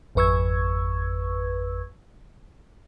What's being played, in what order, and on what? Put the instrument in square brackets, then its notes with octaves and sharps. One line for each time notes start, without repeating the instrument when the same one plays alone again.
[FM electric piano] G#1 F2 B4 C#6 E6 G#6